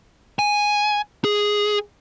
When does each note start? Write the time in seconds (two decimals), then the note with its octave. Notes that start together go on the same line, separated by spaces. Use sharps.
0.39 G#5
1.25 G#4